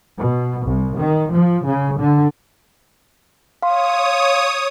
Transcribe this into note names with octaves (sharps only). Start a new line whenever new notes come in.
B2
C2
D#3
F3
C#3
D3
C#5 F5 C6 D#6